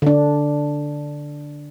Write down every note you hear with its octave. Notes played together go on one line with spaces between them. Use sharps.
D3 D4